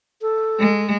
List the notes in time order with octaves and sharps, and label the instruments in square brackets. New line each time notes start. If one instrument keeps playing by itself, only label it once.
[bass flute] A4
[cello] G#3